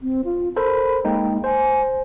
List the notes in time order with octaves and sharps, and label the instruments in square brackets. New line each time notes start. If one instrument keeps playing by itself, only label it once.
[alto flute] C4
F4
[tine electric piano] A4 A#4 C5 [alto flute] B5
[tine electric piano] G#3 A#3 D#4 [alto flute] G5
[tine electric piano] C5 [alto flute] G#5